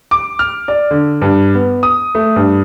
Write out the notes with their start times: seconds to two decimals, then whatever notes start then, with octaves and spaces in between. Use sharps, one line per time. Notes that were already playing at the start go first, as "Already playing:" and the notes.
0.11 D6
0.39 F6
0.68 D5
0.91 D3
1.22 G2
1.54 B3
1.83 D#6
2.15 A3
2.36 G2